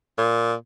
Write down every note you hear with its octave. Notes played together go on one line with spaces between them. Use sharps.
A#2